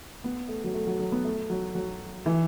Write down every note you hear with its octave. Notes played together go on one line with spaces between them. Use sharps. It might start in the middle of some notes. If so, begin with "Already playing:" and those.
B3
A3
F#3
A3
F#3
F#3
B3
A3
F#3
F#3
E3